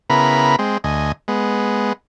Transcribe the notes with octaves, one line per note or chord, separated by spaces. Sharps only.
C#3 B3 E4 A#4 A#5 B5
G#3 C4
D2 D#5 G#5
G#3 B3